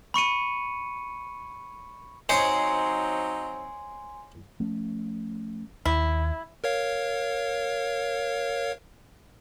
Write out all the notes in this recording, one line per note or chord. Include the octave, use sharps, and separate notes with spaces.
B5 C#6 C#7 D#7
F#3 C4 D#4 C5 C#5 D#5 G#5 C6
F3 A3 C#4
D#2 E4
A#4 C#5 F5